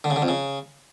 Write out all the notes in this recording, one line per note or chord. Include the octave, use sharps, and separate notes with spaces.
D3
C#3
D3
F2
C#3